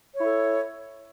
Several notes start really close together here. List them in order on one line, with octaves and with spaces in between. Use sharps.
C#5 E4 A4